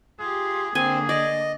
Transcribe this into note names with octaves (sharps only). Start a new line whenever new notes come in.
F4 G4 G#4
D3 A#3 C4 G#4 G#5
D5 D#5